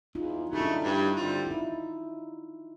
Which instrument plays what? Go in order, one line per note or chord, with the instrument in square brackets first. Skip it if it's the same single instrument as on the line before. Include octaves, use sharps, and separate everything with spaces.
[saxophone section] E2 [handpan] D#4 F4
[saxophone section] C#3 F#3 A3 [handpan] D#4
[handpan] D4 E4
[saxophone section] G2
D3 G3 C4 F4
[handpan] E4
D#4 F4